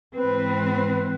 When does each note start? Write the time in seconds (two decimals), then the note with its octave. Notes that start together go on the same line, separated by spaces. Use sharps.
0.14 G#2 E3 C4 B4